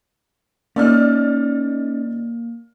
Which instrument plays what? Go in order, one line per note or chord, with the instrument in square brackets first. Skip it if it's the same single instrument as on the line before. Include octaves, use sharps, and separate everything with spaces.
[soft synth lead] A#3 [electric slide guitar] C#4 D#4 [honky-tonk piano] D5 E6 F6